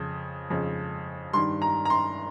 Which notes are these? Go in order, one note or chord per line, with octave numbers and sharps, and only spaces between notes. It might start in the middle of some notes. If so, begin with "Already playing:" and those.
Already playing: F2 C#3
F2 C#3
G2 D#3 C6
A#5
A#5
C6